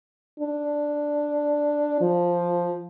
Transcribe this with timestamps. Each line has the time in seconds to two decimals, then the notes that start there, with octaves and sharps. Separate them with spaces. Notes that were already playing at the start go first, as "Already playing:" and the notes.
0.40 D4
2.01 F3